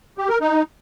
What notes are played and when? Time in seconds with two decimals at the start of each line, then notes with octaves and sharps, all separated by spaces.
0.18 G4
0.29 A#4
0.41 D#4